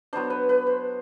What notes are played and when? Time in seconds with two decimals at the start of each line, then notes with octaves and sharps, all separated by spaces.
0.13 F#3 B3 D4 C5
0.30 B4
0.49 B4
0.67 C5